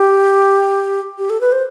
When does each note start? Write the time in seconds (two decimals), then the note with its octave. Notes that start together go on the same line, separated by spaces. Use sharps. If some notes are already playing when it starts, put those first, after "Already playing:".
Already playing: G4
1.18 G4
1.30 A4
1.41 B4
1.52 C5